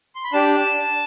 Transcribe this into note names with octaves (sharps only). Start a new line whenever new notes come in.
C6
B5
D4 G4 A5